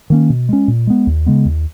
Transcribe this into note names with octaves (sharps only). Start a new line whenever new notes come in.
D#3 A#3 C#4
B2
G#3 C#4
A#2
G#3 B3
D#2
C#3 G#3 B3
D#2